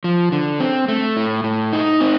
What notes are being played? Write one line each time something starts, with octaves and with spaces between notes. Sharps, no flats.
F3
D3
C4
A3
A2
A2
D#4
C4